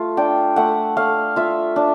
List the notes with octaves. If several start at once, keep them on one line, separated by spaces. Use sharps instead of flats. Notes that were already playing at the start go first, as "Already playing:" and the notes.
Already playing: A3 F4
D4 G5
A3 F#5
A3 F5
F4 E5
D4